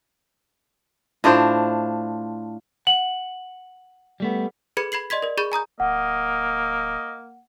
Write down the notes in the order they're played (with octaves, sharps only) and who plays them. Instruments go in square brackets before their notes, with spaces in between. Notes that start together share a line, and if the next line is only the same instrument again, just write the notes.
[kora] A2 D4 F4 C5
[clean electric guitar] F#5 [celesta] F#7
[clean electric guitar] G3 A3 B3
[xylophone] G#4 A4 B4 B5 G#6 C#7
B5 G#6 C7 F#7
D5 D#5 C6 G#6 B6
A#4 D5
G#4 B5 C#6 G6 A6
G#5 A#5 D#6 G6
[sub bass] D1 [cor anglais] A#3 [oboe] D#5 [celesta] F#5